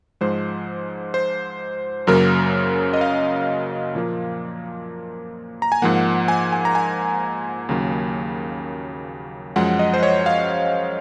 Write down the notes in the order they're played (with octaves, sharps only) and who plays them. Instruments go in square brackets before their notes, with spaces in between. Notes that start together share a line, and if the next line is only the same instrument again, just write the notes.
[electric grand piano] G#2 F3 G#3 C5
C5
F#2 C#3 F#3 A#3 A#4
D#5
F5
A#2 F3 A#3
A#5
G#5
G#2 F3 A#3 F#5
G#5
G#5
A#5
G#5
D#2 C#3 F#3 A#3
F#2 F3 G#3 F#5
D#5
C5
C#5
F5